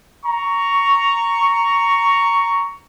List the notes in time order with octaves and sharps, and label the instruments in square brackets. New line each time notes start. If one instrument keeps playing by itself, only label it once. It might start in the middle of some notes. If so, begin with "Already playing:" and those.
[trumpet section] A#5 C#6